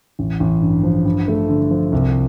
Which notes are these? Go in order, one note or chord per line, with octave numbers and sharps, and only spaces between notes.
A1
A1
G2
F3
G2
A3
D3
F3
C2